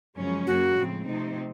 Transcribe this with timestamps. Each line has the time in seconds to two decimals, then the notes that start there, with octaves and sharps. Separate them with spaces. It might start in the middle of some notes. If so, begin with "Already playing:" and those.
0.17 F#2 C#3 F3 G#3 C#4
0.47 F#2 C#3 F#3 A#3 F#4
0.77 A2 F3 G#3 C4
1.07 C3 F3 A3 C4 D#4